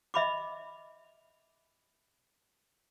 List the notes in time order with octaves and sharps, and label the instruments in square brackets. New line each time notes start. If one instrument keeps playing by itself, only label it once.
[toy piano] D#5 E5 B5 D6